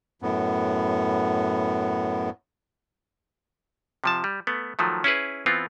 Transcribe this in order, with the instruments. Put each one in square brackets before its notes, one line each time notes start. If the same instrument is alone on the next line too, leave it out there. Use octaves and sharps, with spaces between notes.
[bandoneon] F#2 A2 B3
[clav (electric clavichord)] C3 F3 A5
G3
A3 B3
D#3 F3 F#3 A3
C#4 E4 G#4 B4
E3 B3 C4 F4